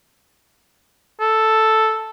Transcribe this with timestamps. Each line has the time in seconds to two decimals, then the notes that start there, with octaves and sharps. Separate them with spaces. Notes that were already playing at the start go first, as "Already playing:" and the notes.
1.21 A4